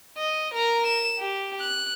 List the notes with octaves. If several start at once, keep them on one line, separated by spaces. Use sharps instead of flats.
D#5
A#4 A#5
E7
G4
F#6